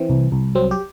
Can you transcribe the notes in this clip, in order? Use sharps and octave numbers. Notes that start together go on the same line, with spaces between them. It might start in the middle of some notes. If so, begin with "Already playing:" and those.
Already playing: E3 C4
C2
C2
F#3 C4
G4